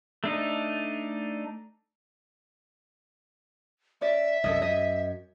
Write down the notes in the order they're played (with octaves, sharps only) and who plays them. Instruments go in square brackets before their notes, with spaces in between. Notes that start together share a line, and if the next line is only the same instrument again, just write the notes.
[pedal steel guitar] A3 D4 D#4
[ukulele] C#4 D5 [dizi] E5
[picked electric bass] C2 F#2 [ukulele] A4 D#5
[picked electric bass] F#2 [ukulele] D#5